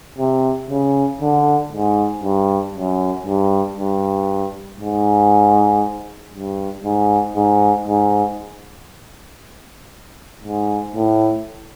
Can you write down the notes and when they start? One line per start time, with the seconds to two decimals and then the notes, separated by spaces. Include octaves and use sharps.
0.19 C3
0.70 C#3
1.21 D3
1.73 G#2
2.24 G2
2.75 F#2
3.26 G2
3.78 G2
4.80 G#2
6.34 G2
6.84 G#2
7.36 G#2
7.88 G#2
10.44 G#2
10.95 A2